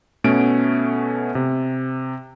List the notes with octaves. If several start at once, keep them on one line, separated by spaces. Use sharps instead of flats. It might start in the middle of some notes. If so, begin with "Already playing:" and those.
B2 A3 B3 C#4 D7
C3